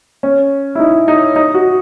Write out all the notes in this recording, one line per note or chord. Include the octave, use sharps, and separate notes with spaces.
C#4
E4
D#4
D#4
D#4
F#4